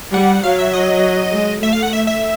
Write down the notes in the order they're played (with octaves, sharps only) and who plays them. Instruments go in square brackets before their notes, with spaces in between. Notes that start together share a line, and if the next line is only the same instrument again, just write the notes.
[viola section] G3 [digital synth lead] F#5
[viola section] F#3 [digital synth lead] F5
[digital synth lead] E5
D#5
[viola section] G#3
[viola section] A3 [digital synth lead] E5
[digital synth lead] F5
F#5
E5
E5